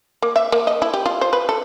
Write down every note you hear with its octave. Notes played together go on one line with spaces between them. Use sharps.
A#3
E5
A#3
D#5
E4
G4
F4
C5
B4
A4